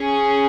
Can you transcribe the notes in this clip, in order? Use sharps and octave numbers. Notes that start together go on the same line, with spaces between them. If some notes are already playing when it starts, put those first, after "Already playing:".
Already playing: C#4 G#4